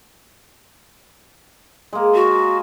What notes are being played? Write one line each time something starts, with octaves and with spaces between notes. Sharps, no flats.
G#3 A#3
F#4